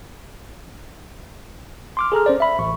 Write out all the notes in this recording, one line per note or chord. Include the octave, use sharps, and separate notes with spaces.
C6 D6 F6
G#4 A4 A#5 F6
C#4 C5 D5
E5 B5
A1 C#6